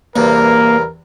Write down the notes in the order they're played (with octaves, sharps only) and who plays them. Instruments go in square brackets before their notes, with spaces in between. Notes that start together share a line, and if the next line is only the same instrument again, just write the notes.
[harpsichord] E2 G2 C3 [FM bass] A#3 [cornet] A#4